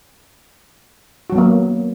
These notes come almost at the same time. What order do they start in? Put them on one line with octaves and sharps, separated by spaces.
F#4 F#3 B3 A#3